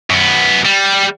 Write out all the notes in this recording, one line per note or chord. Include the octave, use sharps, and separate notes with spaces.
F#2 B3
G3